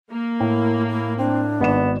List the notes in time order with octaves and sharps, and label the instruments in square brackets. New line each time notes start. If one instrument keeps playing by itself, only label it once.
[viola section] A#3
[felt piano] A2 [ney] E4
[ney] E4
[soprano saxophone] C4 [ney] D4
[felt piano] G#1 D5 E7 [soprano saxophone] B3